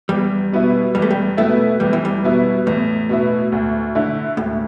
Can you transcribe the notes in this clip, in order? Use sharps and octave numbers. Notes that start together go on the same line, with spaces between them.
E2 G3
B2 B3 E4
E2 G3
A3
G3
B2 A3 B3 E4
E2 G3
E3
G3
B2 B3 E4
E2 A2
B2 B3 E4
D2
D3 A3 E4
D2 A2